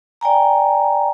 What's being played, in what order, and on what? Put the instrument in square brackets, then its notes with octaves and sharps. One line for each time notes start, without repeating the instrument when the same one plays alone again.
[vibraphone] D5 G5 G#5 A#5